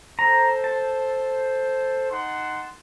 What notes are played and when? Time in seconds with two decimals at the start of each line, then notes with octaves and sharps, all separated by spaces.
0.19 A4 C5 A#5
0.64 A5
2.11 D#4 F#5 C6